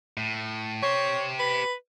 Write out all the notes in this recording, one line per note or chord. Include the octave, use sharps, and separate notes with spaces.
A2
G4 C5 C#5
B4